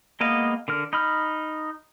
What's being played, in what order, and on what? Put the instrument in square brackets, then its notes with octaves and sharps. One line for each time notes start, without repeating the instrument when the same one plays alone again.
[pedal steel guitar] G#3 A#3 B3 D#5 F5
D3 A#4 F6
D#4 B5 F6